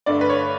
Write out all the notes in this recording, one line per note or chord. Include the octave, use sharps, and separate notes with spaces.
G2 D3 A3 D5
B4
C#5